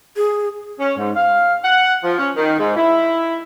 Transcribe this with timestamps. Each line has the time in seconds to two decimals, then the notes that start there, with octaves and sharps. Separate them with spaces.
0.17 G#4
0.79 C#4
0.97 G#2
1.15 F5
1.64 F#5
2.03 F3
2.19 C#4
2.36 D#3
2.59 G#2
2.76 E4